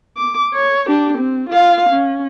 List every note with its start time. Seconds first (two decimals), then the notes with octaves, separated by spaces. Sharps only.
0.17 D6
0.54 C#5
0.88 D4 G4
1.18 C4
1.49 F4 F5
1.89 C#4